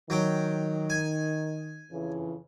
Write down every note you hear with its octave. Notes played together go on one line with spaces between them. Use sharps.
D#3 F#3 G5
G#5
F2 C#3 E3